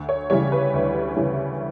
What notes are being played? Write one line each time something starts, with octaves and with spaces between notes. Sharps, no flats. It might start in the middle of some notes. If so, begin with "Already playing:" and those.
Already playing: D2
C#5
C#3 E3 G3 C#5
B4
D2
C#3 E3 G3